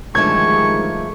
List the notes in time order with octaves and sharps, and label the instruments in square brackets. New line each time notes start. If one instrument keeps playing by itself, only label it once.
[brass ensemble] G2 D#3 G#3 [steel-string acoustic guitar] D3 F3 A3 [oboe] C#6 [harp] G#6